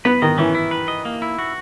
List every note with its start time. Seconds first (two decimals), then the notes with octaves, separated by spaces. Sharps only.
0.05 B3 B4
0.22 D#3 D#5
0.38 E3 C#4
0.54 E4
0.71 B4
0.88 D#5
1.05 A#3
1.22 E4
1.39 F#4